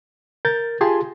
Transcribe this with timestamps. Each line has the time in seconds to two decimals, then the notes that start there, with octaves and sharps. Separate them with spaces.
0.45 A#4 G6 A6
0.81 F4 G4 G#4 G#5 A5 C6